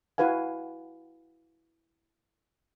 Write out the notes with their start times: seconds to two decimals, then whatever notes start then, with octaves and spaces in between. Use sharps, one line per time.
0.18 E4 F#4 B4 F5 G#5